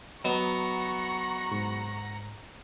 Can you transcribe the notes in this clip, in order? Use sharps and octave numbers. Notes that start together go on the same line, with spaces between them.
F#3 B3 D#5 F#5 A#5 C#6
G#2